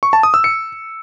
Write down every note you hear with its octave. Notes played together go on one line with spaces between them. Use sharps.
C#6
A5
D#6
E6
C#7